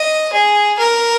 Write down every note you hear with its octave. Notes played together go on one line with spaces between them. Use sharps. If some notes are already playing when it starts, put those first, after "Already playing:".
Already playing: D#5
G#4
A#4